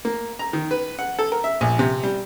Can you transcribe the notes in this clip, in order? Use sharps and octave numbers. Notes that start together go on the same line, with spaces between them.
A#3
A#5
D#3
B4
F#5
A4
A#4
E5
A#1
C3
G3